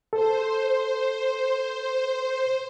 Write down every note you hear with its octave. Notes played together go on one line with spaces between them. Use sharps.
A4 C5